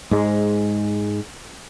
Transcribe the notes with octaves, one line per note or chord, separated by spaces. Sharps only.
G#2 G#3